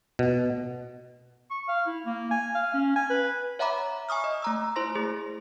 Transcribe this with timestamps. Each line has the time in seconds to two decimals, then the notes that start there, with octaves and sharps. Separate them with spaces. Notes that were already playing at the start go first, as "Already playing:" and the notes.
0.19 B2
1.51 C#6
1.68 F5
1.87 E4
2.06 A#3
2.31 G#5
2.55 F5
2.74 C#4
2.96 G#5
3.10 B4
3.59 C#5 E5 F#5 A#5 B5 D6
4.09 G#5 C#6 D#6 F6
4.24 D#5
4.42 A3 A#5 E6
4.76 E4 C5 C6 A#6
4.95 A3 G#4